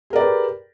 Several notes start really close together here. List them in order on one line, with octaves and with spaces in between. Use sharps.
G#4 A#4 D5 B4 G4